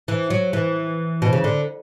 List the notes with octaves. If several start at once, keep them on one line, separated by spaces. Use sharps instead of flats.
E3
F#3
E3
B2
C#3
D3